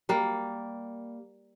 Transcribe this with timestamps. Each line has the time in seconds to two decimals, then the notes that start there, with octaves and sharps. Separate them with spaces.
0.09 G3 A#3